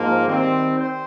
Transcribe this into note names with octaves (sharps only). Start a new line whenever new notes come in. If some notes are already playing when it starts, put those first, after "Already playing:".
Already playing: G#2 F3 A#3
D#3 G3 C4
C5